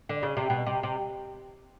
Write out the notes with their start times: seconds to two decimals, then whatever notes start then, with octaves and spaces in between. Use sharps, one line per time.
0.09 D3
0.23 C#3
0.37 C3
0.50 B2
0.67 C3
0.83 C3